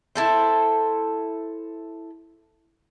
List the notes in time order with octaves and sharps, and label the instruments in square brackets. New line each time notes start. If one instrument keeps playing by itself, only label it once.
[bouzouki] E4 A4 C5